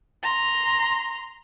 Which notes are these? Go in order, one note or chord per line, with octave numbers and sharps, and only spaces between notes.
A#5 C6